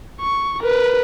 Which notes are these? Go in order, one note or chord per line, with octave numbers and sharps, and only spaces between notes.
C#6
A#4 B4